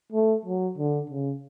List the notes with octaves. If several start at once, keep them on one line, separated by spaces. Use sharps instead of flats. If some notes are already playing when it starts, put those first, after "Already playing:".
A3
F#3
D3
C#3